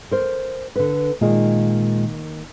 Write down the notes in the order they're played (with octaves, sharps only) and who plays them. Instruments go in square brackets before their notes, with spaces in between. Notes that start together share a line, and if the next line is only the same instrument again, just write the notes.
[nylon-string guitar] A#4 C5
D3 B4
[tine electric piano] A#2 G#3 [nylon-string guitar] D#3 A#3